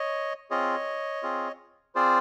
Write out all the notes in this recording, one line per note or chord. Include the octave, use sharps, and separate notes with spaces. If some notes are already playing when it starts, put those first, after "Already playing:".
Already playing: C#5 D#5
C4 F4 G#4 C#5 D#5
C4 F4 G#4
C4 F4 G#4 C5 D5